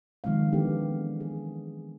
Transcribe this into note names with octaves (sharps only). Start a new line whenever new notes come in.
D#3 F3 G#3 C4 F5
E3 B3 D4 G4 A4
G#4